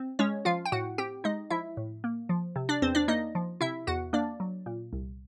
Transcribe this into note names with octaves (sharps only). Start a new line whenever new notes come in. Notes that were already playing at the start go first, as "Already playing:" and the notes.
Already playing: C4
G#3 C#4 C#5
F3 F4 F5
G5
A2 F#4 F#5
C4 G4 G5
G#3 D#4 D#5
F3 E4 E5
A2
A#3
F3
C3
D4 D5
E2 C4 C5
D4 D5
A#3 D#4 D#5
F3
C3 E4 E5
E2 F#4 F#5
A#3 D4 D5
F#3
A#2
C2